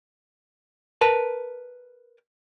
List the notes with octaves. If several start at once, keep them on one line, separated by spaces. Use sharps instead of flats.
A#4 B4 A5